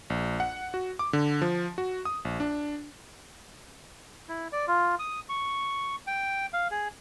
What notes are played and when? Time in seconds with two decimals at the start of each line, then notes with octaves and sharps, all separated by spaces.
0.10 A#1
0.40 F#5
0.74 F#4
0.99 D6
1.13 D3
1.42 F3
1.78 F#4
2.05 D#6
2.25 A#1
2.40 D4
4.29 E4
4.53 D5
4.68 F4
4.99 D#6
5.29 C#6
6.07 G5
6.53 F5
6.71 G#4